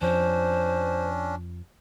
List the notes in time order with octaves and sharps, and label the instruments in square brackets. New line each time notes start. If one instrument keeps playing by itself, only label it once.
[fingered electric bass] F2 F3 [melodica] C#4 D4 [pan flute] C5